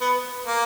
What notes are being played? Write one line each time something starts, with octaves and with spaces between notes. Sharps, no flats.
B3
A#3